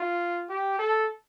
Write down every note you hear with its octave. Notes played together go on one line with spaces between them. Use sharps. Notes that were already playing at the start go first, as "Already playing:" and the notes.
Already playing: F4
G4
A4